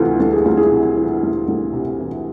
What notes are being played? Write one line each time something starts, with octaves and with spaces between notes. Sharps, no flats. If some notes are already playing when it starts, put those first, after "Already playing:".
Already playing: D2 C3 E3 E4 F4 A4
D2 A4
G#4
D2 F4
E4 G#4
C3
E3
D2
D2
C3
E3